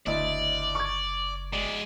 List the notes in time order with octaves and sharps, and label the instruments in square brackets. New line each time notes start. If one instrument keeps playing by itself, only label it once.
[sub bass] F#1 [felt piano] D2 E4 D#5 [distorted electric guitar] D5
[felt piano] C#6 D6 G#6
[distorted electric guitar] G#3 D5